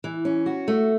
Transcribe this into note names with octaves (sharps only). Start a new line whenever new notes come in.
E3
C#4
F#4
A3